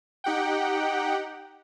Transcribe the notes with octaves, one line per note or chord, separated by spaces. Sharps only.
D#4 G4 F#5 G5